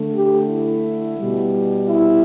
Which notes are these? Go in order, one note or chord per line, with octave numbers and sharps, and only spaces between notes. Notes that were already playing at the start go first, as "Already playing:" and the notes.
Already playing: D3 A3
G4
E4
B2 G3
E4